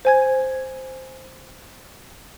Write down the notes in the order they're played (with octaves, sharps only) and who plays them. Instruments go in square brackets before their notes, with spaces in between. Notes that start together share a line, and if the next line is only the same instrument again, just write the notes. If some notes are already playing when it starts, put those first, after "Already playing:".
[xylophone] C5 G#5 G#6